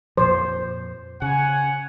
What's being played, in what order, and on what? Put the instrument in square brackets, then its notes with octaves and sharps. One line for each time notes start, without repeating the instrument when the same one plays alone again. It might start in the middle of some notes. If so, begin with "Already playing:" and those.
[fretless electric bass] F2 A#2 F3 [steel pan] C5
[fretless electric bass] C#3 [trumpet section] C#5 F#5 G#5